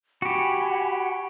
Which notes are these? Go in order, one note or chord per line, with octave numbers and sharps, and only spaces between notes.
F#4 G4 F#5 G#5 B5